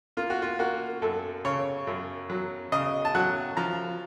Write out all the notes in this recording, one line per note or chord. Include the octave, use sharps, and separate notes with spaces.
A#3 F4
F#4
F4
A#3 F#4
F#2 A4
C#3 C#5
F#2
F#3
C#3 D#5
A5
F#3 F#5
F3 A#5